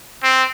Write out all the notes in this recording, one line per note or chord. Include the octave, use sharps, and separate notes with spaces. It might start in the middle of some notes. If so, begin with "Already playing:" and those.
C4